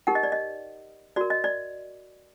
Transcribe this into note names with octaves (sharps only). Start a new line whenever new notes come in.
D#4 G4 A#4 F#5
D#5
D5
D#5
F#4 A#4 D5
D#5
D5